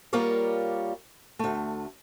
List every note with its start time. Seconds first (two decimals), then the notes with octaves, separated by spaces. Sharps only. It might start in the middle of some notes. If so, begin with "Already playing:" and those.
0.13 G3 A#3 F4 A#4 C#5 D5
1.39 D2 A3